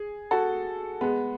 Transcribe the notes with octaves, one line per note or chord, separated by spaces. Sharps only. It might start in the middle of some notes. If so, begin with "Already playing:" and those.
Already playing: G#4
F#4 A4
G#3 B3